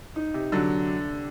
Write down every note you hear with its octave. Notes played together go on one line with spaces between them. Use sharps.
D#4
C3
D3 F#3